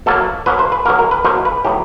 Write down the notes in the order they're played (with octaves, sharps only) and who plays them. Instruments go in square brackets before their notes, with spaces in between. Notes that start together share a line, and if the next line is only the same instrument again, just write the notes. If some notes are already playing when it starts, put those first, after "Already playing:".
[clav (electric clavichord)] B2 F#3 A#3 A4
B2 F#3 A#3 B4
C5
B4
B2 F#3 A#3 A#4
A#4
B4
B2 F#3 A#3 C5
B4
A2 F#3 B3 G4